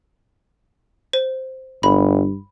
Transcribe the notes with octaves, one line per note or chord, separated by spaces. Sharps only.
C5
G1 G2 B5